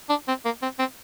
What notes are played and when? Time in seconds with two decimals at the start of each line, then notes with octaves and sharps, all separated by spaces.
0.10 D4
0.28 C4
0.45 A#3
0.62 C4
0.79 C4